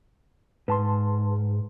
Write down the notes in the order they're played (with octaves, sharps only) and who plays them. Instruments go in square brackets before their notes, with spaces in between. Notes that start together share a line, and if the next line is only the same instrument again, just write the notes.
[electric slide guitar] G#2 [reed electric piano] B4 A5 C6